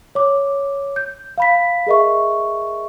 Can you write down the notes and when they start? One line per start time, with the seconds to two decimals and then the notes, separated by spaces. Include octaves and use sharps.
0.15 C#5 D6
0.96 G6
1.38 F5 B5 B6
1.87 G#4 A#4 D#5 E5 C#6